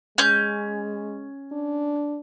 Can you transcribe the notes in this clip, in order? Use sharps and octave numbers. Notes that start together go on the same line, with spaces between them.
G#3 C#4 G6
D4